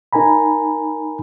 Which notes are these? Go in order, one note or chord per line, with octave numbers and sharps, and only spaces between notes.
D#4 A#4 G#5 A#5 B5